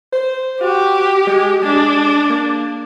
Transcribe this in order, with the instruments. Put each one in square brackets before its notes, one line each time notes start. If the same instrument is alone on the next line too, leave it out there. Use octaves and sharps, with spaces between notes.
[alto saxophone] C5
[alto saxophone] F#4 [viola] G4
[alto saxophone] G#3
[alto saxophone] G#3 [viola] D4
[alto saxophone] A#3